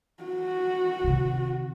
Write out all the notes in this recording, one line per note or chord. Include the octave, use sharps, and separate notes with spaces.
F#4
C3 D#3